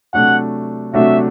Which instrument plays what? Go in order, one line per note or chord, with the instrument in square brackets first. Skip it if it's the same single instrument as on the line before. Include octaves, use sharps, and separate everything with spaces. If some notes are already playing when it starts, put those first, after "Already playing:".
[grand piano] C3 F#3 A3 D4 F#4 [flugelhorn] F#5
[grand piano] C3 F#3 A3 D4 F#4 [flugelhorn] E5